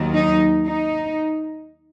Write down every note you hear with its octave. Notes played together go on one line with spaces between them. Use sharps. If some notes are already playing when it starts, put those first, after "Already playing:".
Already playing: D#2 D#3 F#3
D#4
D#4